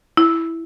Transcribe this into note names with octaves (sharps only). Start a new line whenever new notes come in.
E4